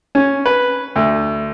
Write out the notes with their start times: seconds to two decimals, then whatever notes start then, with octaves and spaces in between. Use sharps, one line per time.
0.15 C#4
0.46 B4
0.96 D2